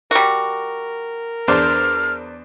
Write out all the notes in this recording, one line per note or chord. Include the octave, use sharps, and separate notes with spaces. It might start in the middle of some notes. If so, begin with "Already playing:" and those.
G3 F#4 A#4
E2 D4 C5 F6